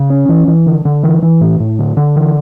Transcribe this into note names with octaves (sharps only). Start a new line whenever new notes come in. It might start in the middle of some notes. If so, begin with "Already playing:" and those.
Already playing: C#3
C#4
E3
E3
D3
D3
E3
E3
A2
A2
D3
D3
E3